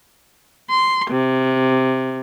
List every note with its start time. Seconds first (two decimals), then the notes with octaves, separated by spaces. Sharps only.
0.70 C6
1.09 C3